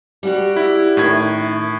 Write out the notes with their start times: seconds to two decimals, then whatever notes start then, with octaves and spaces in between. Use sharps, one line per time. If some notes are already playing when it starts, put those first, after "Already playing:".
0.23 G3 F#4 G4
0.57 E4
0.97 F#2 A2 D#3 G#6